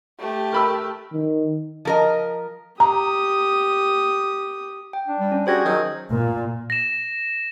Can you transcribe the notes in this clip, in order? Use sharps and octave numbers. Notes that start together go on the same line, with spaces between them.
A3 G4
A#4 B5 E6
D#3
F3 A#4 D#5
G4 A#5 D#6
G5
D4
G3
C#4
G3 F#4 G#4 C5 G#6 A#6
D#3 F#3
A#2
A#6 E7